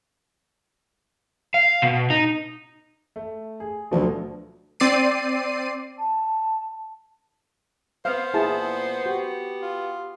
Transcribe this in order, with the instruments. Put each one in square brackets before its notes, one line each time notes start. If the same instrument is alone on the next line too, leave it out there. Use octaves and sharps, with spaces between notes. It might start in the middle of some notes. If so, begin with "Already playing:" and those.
[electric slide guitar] F5
B2
D#4
[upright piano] A3
G#4
[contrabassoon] D2 [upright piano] B2 F3 F#3
[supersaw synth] C4 D5 C7 D#7
[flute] A5
[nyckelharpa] B3 [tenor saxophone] C5 [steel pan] F5
[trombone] A#2 [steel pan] E4 G#4 A5
[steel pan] F#4 [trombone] G4
[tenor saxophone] F4